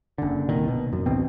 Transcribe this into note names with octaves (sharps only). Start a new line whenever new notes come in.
F#1 D3
C2 A#2 D#3
B2
F#2
A1 D2 B2 C4